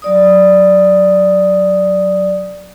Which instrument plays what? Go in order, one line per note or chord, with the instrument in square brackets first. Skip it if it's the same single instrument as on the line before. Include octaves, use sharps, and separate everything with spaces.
[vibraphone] F#3 D5 D#6